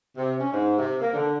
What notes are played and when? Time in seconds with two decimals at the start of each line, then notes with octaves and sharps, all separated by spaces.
0.17 C3
0.39 C#4
0.52 G#2
0.78 C3
1.00 A#3
1.13 D3